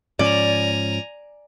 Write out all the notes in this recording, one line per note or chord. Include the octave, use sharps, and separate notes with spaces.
G#2 F3 C#4 D5 G#5 A#5